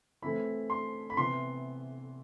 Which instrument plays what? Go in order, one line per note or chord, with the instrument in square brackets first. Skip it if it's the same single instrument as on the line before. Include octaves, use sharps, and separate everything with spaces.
[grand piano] E3 A3 C4 E4 B5
C6
B5
C3 E3 B3 E4 C6